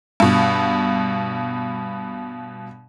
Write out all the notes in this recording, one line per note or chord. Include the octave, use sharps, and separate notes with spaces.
G2 B2